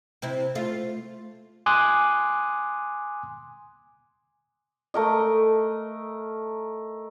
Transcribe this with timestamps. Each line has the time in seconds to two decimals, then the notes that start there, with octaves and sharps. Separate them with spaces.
0.22 C3 C4 E4
0.55 A3 F4
1.66 G#5 C6 D6 D#6 F#6
4.94 A3 A#4 D#5